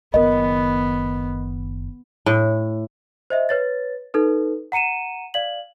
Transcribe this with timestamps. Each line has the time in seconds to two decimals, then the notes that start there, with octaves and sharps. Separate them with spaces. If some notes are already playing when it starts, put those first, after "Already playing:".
0.14 F#1 D#3 B3 A#4 D#5
2.26 A2
3.30 C5 D#5 E5
3.49 B4 C#5 A6
4.14 D#4 A4 B4
4.72 F#5 A#5 C#7 D#7 E7
5.34 D5 F5 F#7